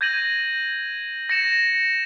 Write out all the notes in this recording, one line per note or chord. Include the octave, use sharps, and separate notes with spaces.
G6 G#6 A#6 D#7 F#7
A#6 C#7 E7